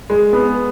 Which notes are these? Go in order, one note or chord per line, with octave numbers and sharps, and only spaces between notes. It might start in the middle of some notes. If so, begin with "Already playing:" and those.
G#3
B3